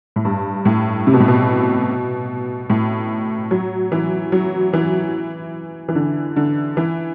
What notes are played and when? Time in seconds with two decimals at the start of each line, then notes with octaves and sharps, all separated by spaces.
0.16 A2
0.25 G2
0.65 A2
1.07 C3
1.13 B2
1.20 A2
1.28 B2
2.70 A2
3.51 F#3
3.92 E3
4.32 F#3
4.73 E3
5.89 E3
5.95 D3
6.36 D3
6.77 E3